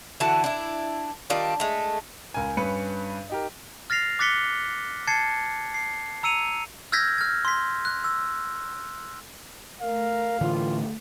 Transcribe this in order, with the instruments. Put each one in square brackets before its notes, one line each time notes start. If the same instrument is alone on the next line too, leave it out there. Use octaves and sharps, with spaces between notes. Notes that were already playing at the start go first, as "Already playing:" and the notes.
[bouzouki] D3 E3 F#4 A5
D4 E4
D#3 G3 D4 F4
G#3 A3
[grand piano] C#2 A#4 G#5
G2 C#4 B4 C#7
D#4 G4 A#4
[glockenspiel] F6 A6 A#6 C7 F7
D6 F#6 A6 B6 C#7 G7
A5 G#6 A6 C7 C#7
C7
A#5 E6 C#7 D#7 F7
E6 F6 G6 G#6 A#6 B6
F6 G#6
C6 B6
F#6
E6
[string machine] A3 [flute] A#4 [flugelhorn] F5
[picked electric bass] A2 D3 E3 [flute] F4